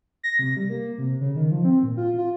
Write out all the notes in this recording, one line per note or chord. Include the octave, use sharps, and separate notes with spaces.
A#6
C3
G3
A#3
C3
C#3
D#3
F3
C4
A#2
F4
F4